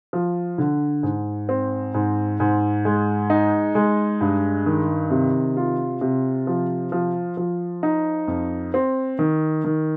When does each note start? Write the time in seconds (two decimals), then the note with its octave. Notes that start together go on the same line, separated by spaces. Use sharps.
0.13 F3
0.58 D3
1.03 G#2
1.49 C4
1.94 G#2
2.40 G#2
2.85 G#3
3.30 D#4
3.75 G#3
4.21 G2
4.66 D#3
5.11 C3
5.57 F4
6.01 C3
6.47 F3
6.92 F3
7.37 F3
7.83 D#4
8.28 F2
8.74 C4
9.19 D#3
9.64 D#3